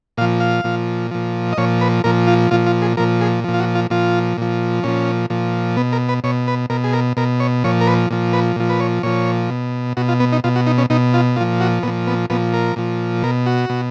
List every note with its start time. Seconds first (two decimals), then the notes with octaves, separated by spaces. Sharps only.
0.17 A#2 F5
0.21 F3
0.40 F5
0.64 A#2 F3
1.11 A#2 F3
1.53 D#5
1.57 A#2 F3 C#5
1.81 B4
2.04 A#2 F3 A#4
2.27 F4
2.51 A#2 F3 F4
2.67 F4
2.82 G#4
2.97 A#2 F3 A#4
3.21 G#4
3.44 A#2 F3
3.54 F4
3.60 F#4
3.75 F4
3.90 A#2 F3 F4
4.38 A#2 F3
4.83 A#2 F3 C#4
5.30 A#2 F3
5.77 B2 B3
5.93 A#4
6.09 B4
6.24 B2 C#5
6.48 B4
6.70 B2 A#4
6.84 G#4
6.93 A#4
7.17 B2 A#4
7.40 C#5
7.64 A#2 F3 C#5
7.81 A#4
7.87 B4
8.10 A#2 F3
8.33 B4
8.56 A#2 F3
8.70 B4
8.80 C#5
9.03 A#2 F3 C#5
9.50 B2
9.97 B2 F#4
10.09 F4
10.20 B3
10.32 D#4
10.44 B2 F4
10.56 F#4
10.67 D#4
10.78 C#4
10.90 B2 D#4
11.14 F4
11.36 A#2 F3 F4
11.61 F#4
11.83 A#2 F3 B3
12.07 B3
12.30 A#2 F3 B3
12.54 A#4
12.76 A#2 F3
13.23 B2 A#4
13.46 F#4
13.70 B2